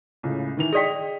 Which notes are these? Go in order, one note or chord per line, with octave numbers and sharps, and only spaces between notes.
C#2 A2 C#3
D#3 E3 F7
G#4 D5 D#5 G5 D#6 B6